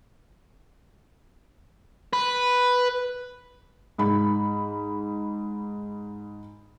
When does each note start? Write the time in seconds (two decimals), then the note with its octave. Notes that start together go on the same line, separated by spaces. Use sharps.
2.13 B4
3.98 G#2 B5